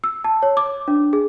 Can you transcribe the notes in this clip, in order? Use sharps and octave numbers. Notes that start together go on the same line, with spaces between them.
E6
A5
C#5
D6
D4
G#4